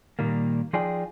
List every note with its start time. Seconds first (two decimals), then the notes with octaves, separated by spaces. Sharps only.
0.19 A#2 D#3 G3 A#3
0.73 F3 D#4 F4 G#4 D5 G5